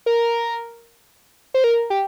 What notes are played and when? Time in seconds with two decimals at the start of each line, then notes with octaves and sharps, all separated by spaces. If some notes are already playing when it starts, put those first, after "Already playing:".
0.06 A#4
1.54 C5
1.64 A#4
1.90 G4